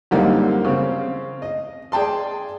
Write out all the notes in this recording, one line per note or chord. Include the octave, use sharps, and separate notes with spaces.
F#2 D3 G3 A#3 C4 D#4
C#3 C4
D#5
G#4 D5 G5 A5 C6